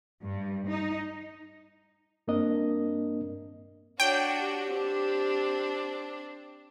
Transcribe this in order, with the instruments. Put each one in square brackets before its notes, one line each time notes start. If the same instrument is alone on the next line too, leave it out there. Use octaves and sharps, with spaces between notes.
[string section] G2
D#4
[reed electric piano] G2 A#3 C4 D4 A#4 D#5
[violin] D4 F#4 [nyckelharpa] C#5 [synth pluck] G5
[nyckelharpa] G4
[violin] C4 D4